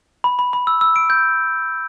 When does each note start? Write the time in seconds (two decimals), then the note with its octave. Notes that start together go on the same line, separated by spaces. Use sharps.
0.24 B5
0.39 B5
0.53 B5
0.67 E6
0.81 E6
0.96 D7
1.10 G6